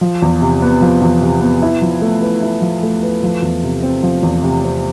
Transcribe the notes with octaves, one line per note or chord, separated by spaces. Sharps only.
F3
E2
C3
B3
F3
E2
C3
B3
E4
F3
A3
B4
E4
F3
A3
B4
F3
E2
C3
C4
F3
E2
C3
C4